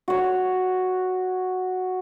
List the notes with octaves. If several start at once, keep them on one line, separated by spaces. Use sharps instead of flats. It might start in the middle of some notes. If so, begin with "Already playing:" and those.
F#4 C#5